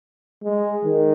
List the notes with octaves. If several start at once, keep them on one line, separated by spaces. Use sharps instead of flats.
G#3
D#3